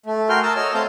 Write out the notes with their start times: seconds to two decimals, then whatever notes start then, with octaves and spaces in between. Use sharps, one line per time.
0.06 A3
0.29 F#4 A#4 G5 G#5 C6 F6
0.43 A#4 A5 D#6 E6
0.56 C#5 D#5 E6 F6
0.74 A3 C4 F5 A5 D#6 G6